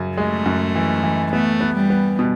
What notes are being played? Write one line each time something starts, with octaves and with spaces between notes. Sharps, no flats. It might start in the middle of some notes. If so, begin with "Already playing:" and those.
Already playing: F#2 C#3
G#3 A3
F#2
E3
E3
A3 B3
B3
G3
B3
B2